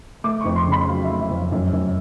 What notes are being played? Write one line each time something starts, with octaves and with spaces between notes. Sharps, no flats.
A3 D6
F2 C#6
C6
C#3
B5
F#3 F5
E5
A3
E5
F2
F5
F#2
F#2